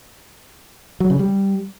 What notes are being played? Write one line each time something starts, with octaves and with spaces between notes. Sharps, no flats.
F#3
C#3
G3